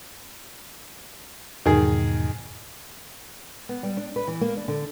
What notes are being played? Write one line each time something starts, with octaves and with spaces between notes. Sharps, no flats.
E2 G#2 B2 D#3 G#4
B3
G3
D4
B4
E3
A#3
D4
D3